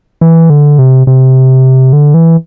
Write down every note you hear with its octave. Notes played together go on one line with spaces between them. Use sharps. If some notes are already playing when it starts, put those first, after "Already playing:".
E3
D3
C3
C3
D3
E3